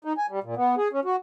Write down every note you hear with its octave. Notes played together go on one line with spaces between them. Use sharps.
D#4
G#5
G3
A#2
B3
G#4
C#4
F#4